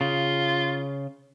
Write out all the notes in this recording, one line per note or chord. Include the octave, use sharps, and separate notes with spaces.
C#3 F4